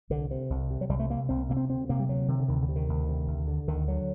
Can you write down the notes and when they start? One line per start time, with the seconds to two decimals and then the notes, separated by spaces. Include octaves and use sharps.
0.10 C2 D3
0.31 C3
0.50 C2
0.70 C3
0.81 F#3
0.89 C2 G3
1.00 A3
1.10 C3 A#3
1.29 C2 C4
1.49 C3 A#3
1.57 C4
1.69 D2 C4
1.89 C3 A#3
2.00 G3
2.09 D2 F#3
2.28 C3 D#3
2.40 D3
2.48 D2 D#3
2.62 D3
2.69 C3
2.76 D#3
2.89 D2
3.09 C3
3.28 D2
3.48 D3
3.67 D2 D#3
3.88 D3 F#3